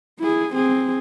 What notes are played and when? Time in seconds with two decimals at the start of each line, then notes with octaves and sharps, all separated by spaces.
0.20 E4 G#4
0.54 C4 G#4